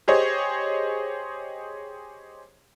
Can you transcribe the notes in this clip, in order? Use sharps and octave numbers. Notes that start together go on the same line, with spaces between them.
G4 G#4 C5 C#5 D#5